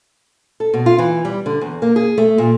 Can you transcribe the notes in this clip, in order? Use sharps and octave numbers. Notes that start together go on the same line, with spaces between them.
A4
B2
F4
E3
G3
D3
E2
A#3
G#4
A3
A#2